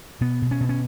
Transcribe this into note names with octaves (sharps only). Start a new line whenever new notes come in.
B2 B3
B2
C#4
B2
C#4